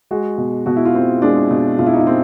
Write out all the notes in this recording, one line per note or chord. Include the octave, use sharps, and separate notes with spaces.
G#3 F#4
B2
B2 F#4
E4
F4
C4
G#3 D4
B2
B2 F4
E4
D#4
E4
C4